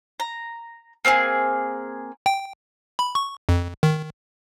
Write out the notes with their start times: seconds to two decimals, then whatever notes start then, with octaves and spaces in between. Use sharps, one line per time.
0.20 A#5
1.05 A#3 C4 F4 G#4
2.26 G5
2.99 B5
3.15 C#6
3.49 F2
3.83 D#3